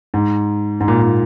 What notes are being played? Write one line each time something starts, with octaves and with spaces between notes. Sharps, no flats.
G#2
G#2
A#2
A#2